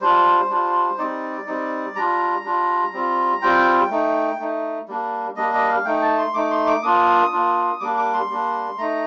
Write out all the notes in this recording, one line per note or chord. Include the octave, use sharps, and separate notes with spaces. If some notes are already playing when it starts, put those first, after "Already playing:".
G3 D4 F4 C5
G3 D4 F4
G3 C4 D#4 D5
G3 C4 D#4
G3 D4 F4 A#5
G3 D4 F4
G3 C4 F4
G3 C4 F4 G5
A3 D#4
A3 D#4
G3 A#3 D4
G3 A#3 D4 D#5
D#5
F5
A3 D#4 G5
A5
C6
A3 D#4 D6
C6
D6
A#3 D4 F4 D#6
A#3 D4 F4
G3 A#3 D4 D6
D6
C6
G3 A#3 D4
A3 D#4 A#5